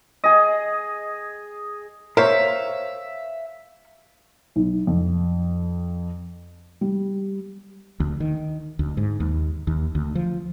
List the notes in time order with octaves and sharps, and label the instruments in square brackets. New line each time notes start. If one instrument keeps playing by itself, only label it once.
[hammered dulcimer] G#4 D#5
[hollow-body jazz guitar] A#4 C5 C#5 [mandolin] E5 F5
[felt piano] B1
F2
G3
[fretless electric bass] D2
D#3
D2
G#2
D#2
D#2
D2
F3